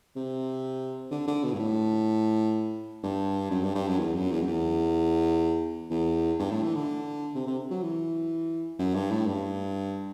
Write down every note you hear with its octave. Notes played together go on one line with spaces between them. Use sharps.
C3
D3
D3
B2
G2
A2
G2
F#2
G2
G2
F#2
E2
F#2
E2
F#2
E2
E2
G2
A2
E3
D3
C3
C3
F#3
E3
F#2
G2
A2
G2